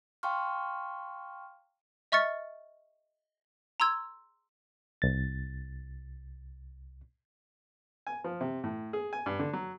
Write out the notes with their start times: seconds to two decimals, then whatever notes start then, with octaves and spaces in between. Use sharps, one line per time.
0.23 F5 G5 A5 C6 C#6 F6
2.12 D#5 E5 C#6 F6 A6 C#7
3.80 A#5 C6 E6 G#6
5.02 C2 A6
8.07 G#5
8.24 F3
8.41 C3
8.64 A2
8.93 G#4
9.13 G#5
9.26 G2
9.39 D3
9.53 F#3